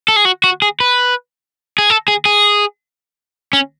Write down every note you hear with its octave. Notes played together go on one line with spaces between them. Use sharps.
A4
G#4
F#4
F#4
G#4
B4
G#4
A4
G#4
G#4
C#4